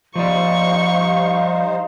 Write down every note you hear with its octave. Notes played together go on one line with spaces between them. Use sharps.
F3 G3 D#4 C5 D5 F5 C#6